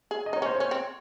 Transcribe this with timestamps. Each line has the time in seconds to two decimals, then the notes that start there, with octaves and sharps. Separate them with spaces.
0.11 G#4
0.26 D#5
0.33 D#4
0.36 C#5
0.42 C#4 C5
0.55 C#5
0.60 C#4
0.71 C4